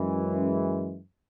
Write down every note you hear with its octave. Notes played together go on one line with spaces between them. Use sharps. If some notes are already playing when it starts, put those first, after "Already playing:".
Already playing: F#2 E3 G#3
C#4